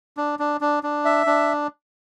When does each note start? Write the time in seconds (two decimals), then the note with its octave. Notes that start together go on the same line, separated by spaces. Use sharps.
0.17 D4
0.39 D4
0.61 D4
0.83 D4
1.05 E5
1.26 D4